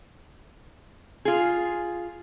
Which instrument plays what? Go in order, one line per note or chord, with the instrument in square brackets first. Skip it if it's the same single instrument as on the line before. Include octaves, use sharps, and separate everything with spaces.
[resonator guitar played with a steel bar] F4 G#4